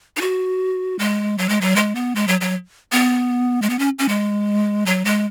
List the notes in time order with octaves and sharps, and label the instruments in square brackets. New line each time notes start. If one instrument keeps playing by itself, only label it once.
[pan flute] D#4
F#4
G#3
F#3
G#3
F#3
G#3
B3
G#3
F#3
F#3
B3
G#3
B3
C#4
C#4
G#3
F#3
G#3